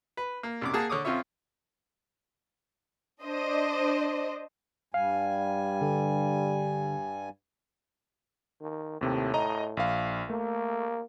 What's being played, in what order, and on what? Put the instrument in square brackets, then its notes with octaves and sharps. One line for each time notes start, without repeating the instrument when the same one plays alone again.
[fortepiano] B4
A#3
C2 F#2 D6
A#3 G#4 F#5 A5
D3 C#5 D6 D#6
F2 C4 C#4 F4 C#5 E5
[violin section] D4 C5 D#5
[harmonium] G2 G3 G#5 [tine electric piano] F5
[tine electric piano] D3
[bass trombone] D#3
[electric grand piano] D#2 C3 [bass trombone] A2
[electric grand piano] D#5 A#5
A#1 F5
[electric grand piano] A3 [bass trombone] A#3